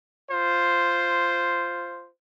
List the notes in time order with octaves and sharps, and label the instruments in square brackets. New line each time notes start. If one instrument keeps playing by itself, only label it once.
[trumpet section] F4 C5